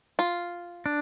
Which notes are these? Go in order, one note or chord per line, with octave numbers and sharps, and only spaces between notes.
F4
D4